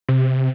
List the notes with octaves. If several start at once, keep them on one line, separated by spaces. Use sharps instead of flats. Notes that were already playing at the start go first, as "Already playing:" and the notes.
C3